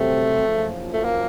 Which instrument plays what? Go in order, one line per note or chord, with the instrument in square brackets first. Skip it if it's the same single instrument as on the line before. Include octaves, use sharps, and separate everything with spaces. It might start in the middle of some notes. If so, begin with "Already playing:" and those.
Already playing: [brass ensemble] C2 C3 F#3 C4 [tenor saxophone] A3
[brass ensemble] F#1 F#2 F3
[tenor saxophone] A3
A#3